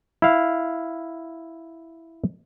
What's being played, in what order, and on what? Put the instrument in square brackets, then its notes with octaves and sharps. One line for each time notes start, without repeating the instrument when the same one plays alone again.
[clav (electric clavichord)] E4 F5